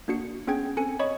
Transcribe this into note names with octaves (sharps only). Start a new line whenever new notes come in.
A#3 D4 F#4 C#7
B3 C#4 G#4 G5 G#6
C4 A4 G#5 C#7
C#5 D#5 B5 C#6